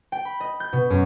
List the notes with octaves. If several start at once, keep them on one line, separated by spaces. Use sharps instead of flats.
G5
B5
D#5
G6
B2
F#2